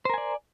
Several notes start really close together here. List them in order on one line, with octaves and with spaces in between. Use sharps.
C5 A#4 G#5 D5